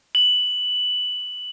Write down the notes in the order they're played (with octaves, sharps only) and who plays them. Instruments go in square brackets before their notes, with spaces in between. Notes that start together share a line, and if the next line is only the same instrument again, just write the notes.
[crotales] F#7